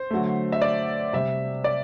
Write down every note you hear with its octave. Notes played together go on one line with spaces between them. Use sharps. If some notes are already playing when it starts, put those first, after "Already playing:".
Already playing: C5
D3 F#3 A3
E5
D5
C3 G3 E5
D5